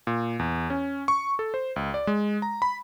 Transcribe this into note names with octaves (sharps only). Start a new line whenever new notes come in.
A#2
E2
C#4
C#6
A4
C5
C#2
D5
G#3
A#5
B5